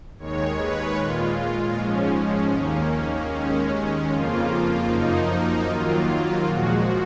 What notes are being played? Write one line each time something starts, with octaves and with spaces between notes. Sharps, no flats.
D#2 D#3 G#3 C#5
B4
A#2 G#3 F4
G#2 F3 G#3 C#4
D#2 D#3 A#3
D#2 D#3 G#3 C#4
F2 C#3 F3 A#3 F4
F#2 F3 A#3 D#4
D#2 D#3 F#3 A#3 F4
A#2 F3 G#3 F#4